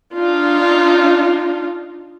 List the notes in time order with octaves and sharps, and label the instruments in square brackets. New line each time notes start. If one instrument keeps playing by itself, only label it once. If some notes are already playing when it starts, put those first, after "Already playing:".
[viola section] D4 D#4 F4